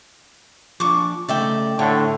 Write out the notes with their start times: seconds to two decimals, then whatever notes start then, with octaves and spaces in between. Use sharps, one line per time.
0.80 F3 D4 C#6 D6
1.29 C#3 A3 D#4 D5 E5 G5
1.79 A2 D3 A4 C#5 E5 G5